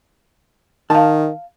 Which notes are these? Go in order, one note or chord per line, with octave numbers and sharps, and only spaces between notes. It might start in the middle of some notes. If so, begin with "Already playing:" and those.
D#3 F5 A5